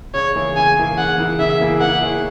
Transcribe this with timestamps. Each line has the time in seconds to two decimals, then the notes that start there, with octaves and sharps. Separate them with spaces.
0.14 C#3 C#5
0.35 E3 A#3 E4 G#4
0.56 C#3 G#5
0.77 E3 A#3 E4 G#4
0.97 C#3 F#5
1.18 E3 A#3 E4 G#4
1.39 C#3 E5
1.59 E3 A#3 E4 G#4
1.80 A#3 F#5
2.01 E4 G#4 C#5